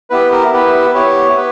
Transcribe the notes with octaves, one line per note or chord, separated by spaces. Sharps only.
B3 E4 G4 B4
A#4
B3 E4 G4 B4
B3 E4 G4 C#5
B3 B4